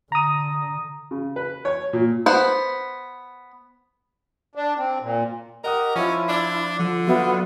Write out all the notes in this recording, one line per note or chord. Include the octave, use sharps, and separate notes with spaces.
D3 A#5 D#6
C#3
B4
C#5
A#2
B3 C5
D4
C4
A#2
G4 A#4 D#5 F#5 D#6
F3 C#4 E4 F4
D4
D3 F3
F#3 B3 F4 E5